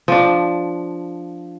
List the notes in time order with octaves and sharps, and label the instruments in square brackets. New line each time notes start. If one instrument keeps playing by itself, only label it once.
[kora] F3 D4